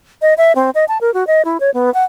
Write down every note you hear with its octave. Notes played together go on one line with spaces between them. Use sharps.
D#5
E5
C4
D#5
A5
A#4
F#4
D#5
E4
C#5
B3
F#5